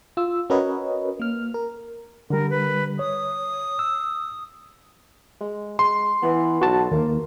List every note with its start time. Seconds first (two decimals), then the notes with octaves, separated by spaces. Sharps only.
0.17 F4 E6
0.50 C#4 F#4 A#4 B4 C#5 D#5
1.20 A#3 F6
1.54 A#4
2.30 D3 G3 A#4
2.50 B4
2.99 C#5 D#6
3.79 E6
5.41 G#3
5.79 G#3 C6
6.22 E3 B3
6.62 B1 F#4 A5
6.91 D#2 A#3 A#4